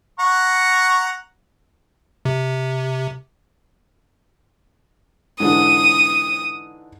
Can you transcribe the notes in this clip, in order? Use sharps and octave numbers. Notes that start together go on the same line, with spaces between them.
F#5 A#5 C#6
C3
G#2 D3 E3 D#6